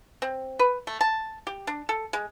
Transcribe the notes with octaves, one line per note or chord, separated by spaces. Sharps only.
C4
B4
A3
A5
G4
D4
A4
G#3